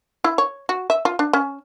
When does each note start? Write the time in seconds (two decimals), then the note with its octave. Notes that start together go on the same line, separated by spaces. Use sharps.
0.24 E4
0.38 C#5
0.69 F#4
0.90 E5
1.05 F4
1.19 D4
1.33 C#4